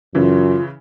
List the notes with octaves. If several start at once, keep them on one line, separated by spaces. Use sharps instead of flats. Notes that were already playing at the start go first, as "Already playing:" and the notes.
F#2 C#3 E3 F4